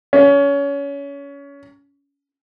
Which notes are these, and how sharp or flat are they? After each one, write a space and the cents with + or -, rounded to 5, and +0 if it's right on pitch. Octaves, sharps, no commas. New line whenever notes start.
C#4 +25